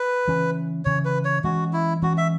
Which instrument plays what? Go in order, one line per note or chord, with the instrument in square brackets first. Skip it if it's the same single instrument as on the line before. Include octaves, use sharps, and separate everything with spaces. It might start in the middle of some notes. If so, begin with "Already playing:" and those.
Already playing: [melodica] B4
[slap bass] C#3 E3 C#4
[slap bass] C#3 E3 C#4 [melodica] C#5
[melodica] B4
C#5
[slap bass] E3 G#3 C#4 [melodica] F#4
[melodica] E4
[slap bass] E3 G#3 C#4 [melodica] F#4
[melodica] E5